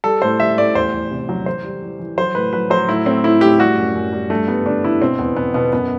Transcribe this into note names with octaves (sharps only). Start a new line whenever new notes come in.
G3 A4
A2 C5
G3 E5
A2 D5
E2 C5
E2
C3
F#3
E3 C5
G3
E3
E3
F#3 C5
A2 B4
F#3 B4
F#3 C5
A2 E4
A2 C4
A2 E4
A2 G4
G3 F#4
F#2
F#2
G3
G2 A3
G3 B3
D3 D4
D3 E4
B2 C4
E2 B3
B2 B3
B2 B3
F#2 B3